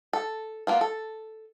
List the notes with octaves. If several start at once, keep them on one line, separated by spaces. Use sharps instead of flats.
A4
A#3 B3 F4
A4